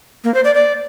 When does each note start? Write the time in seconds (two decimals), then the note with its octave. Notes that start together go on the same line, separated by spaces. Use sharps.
0.24 A#3
0.34 C5
0.44 D5
0.54 D5